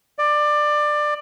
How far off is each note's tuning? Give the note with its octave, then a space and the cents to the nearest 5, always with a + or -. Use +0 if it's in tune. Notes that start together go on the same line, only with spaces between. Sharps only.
D5 +20